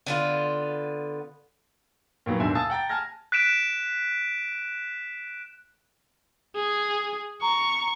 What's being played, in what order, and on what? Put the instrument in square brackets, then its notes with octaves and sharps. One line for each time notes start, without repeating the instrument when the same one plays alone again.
[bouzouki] D3 B3 F4
[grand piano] A#2 D#3 F#3 B3
D#2 G#2 B2 D3 E5 G#5
F5 G#5 A5 D#6 E6 A6
F#5 G5 A#5 A6
G#5 A5 F6 G#6 A#6
[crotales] F#6 B6 D7 E7
[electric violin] G#4
[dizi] A#5 [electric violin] C#6